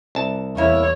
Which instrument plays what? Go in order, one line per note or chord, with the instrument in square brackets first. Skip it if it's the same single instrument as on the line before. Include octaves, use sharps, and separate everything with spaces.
[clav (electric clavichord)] C2 A5
[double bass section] E2 [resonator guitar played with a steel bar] A#3 E4 [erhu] C#5